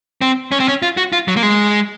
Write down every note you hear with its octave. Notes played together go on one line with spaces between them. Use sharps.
C4
C#4
C4
C#4
F4
F#4
F4
F#3
A#3
G#3